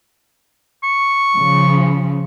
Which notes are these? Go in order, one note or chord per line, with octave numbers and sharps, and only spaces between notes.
C#6
C#3 F3